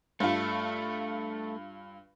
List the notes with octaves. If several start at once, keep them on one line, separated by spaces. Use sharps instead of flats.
G2 A3 F4